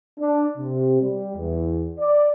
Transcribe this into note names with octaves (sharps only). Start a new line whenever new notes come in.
D4
C3
G3
E2
D5